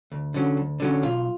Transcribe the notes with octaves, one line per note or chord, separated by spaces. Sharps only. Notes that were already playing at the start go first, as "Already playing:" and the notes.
D2
D3 F#3 C#4
D2
D3 F#3 C#4
B1 F4